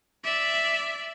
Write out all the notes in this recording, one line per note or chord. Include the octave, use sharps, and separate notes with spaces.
D5 E5